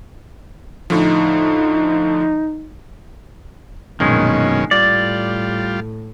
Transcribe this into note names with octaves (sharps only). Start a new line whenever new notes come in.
A2 D3 F3 D#4
A#1 F#2 B2 D#3 G#3 C#4
A2 G3 F4 D5